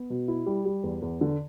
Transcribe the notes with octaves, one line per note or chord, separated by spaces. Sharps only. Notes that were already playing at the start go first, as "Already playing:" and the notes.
Already playing: B3
B2
E4
G3
G3
E2
E2
D3